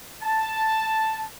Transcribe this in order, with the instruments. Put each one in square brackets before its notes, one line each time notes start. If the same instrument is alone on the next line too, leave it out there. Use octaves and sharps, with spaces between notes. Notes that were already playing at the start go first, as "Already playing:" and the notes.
[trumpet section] A5